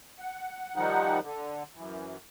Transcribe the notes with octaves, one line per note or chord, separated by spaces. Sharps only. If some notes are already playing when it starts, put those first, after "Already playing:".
F#5
D#3 F3 G3 D#4 F#5
D3
F#2 E3